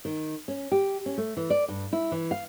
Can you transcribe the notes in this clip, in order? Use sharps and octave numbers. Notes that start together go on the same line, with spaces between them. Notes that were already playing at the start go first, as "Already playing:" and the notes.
D#3
C#4
G4
C#4
A3
E3
D5
G2
E4
E3
F5